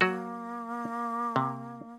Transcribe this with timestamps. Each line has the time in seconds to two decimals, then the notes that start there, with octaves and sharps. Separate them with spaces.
0.01 F#3 A#3 F#4
1.36 C3